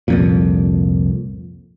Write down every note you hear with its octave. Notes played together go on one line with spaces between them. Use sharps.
C2 F2 A#2